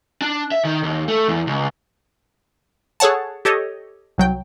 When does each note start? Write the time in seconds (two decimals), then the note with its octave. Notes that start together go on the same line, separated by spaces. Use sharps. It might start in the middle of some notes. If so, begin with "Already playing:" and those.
0.22 D4
0.52 E5
0.65 D#3
0.83 D#2
1.08 A3
1.28 E2
1.47 C#2
3.00 G#4 A4 C#5 F#5 A5
3.45 G4 A4 C#5 D#5
4.18 C2 F#3 G5